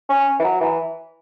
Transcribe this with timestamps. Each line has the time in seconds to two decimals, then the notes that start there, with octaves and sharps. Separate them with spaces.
0.09 C#4
0.39 E3
0.44 F#3
0.61 E3